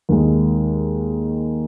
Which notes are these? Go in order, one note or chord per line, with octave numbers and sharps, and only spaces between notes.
D#2 D#3 G#3